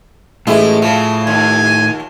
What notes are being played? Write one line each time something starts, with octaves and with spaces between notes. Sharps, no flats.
A1 A2 G#3 E4
C#3 F3
D#2 G#5